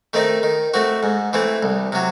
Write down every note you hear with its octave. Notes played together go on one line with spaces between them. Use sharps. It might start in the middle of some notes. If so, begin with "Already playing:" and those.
D#3 A3 C4 D#4
D#3
A3 C4 F#4
G#2
E3 A3 C4
C2
C3 F#3